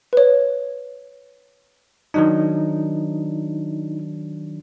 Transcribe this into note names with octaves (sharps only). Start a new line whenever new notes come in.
B4 C#5
D#3 F#3 D4 D#4